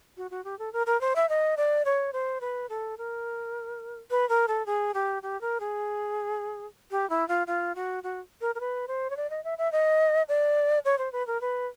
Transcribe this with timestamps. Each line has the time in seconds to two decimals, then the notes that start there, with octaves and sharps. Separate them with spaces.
0.17 F#4
0.31 F#4
0.45 G4
0.59 A4
0.73 A#4
0.87 A#4
1.01 C5
1.16 E5
1.29 D#5
1.57 D5
1.85 C#5
2.13 C5
2.41 B4
2.69 A4
2.98 A#4
4.11 B4
4.29 A#4
4.48 A4
4.66 G#4
4.94 G4
5.23 G4
5.41 A#4
5.60 G#4
6.91 G4
7.10 E4
7.28 F4
7.47 F4
7.76 F#4
8.03 F#4
8.41 A#4
8.55 A#4
8.60 B4
8.88 C5
9.10 C#5
9.17 D5
9.30 D#5
9.44 E5
9.58 E5
9.72 D#5
10.28 D5
10.85 C#5
10.98 C5
11.13 B4
11.27 A#4
11.41 B4